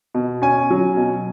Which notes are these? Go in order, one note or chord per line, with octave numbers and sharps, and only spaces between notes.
B2
C#4 G#5
F#3
B2